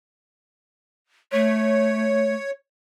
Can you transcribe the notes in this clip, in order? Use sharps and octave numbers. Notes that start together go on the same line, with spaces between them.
A3 C#5